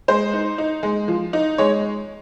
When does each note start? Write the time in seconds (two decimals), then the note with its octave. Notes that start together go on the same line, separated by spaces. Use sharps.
0.08 G#3 C5
0.33 D#4
0.58 D#4
0.83 G#3
1.08 F3
1.33 D#4
1.58 G#3 C#5